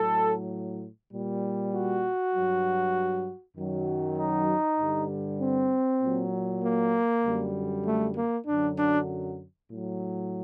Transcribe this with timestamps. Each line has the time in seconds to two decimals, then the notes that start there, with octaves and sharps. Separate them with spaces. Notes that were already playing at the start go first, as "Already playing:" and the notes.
Already playing: A2 F#3 A4
1.12 A#2 G3
1.73 F#4
2.34 G2 F#3
3.57 F#2 D#3 F#3
4.17 D#4
4.79 G2 D3 G3
5.40 C4
6.01 A#2 F#3
6.63 A#3
7.24 F#2 D3 G3
7.85 A3
8.16 A#3
8.46 F#2 D3 F#3 D4
8.77 D4
9.70 A2 F#3